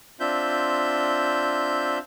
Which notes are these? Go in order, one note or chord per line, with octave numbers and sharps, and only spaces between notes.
C4 D4 F4 E5 G6